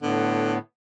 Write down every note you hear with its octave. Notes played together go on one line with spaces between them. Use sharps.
A2 D3 B3